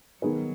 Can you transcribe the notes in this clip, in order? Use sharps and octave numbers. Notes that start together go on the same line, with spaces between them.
D#3 F#3 B3 D#4 G#4 B4